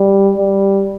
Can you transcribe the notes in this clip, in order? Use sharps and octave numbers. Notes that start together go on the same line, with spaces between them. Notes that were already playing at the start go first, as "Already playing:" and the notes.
Already playing: G3
G3